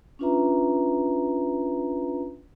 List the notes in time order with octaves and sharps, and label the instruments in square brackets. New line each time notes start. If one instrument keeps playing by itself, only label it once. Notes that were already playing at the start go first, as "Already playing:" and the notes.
[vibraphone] C#4 D4 F4 B4 E5 A#5